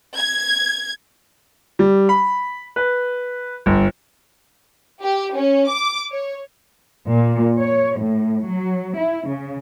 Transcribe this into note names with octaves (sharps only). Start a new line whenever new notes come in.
G#6
G3
B5
B4
G1
G4
C#4
D6
C#5
A#2
C#5
A2
F#3
E4
C#3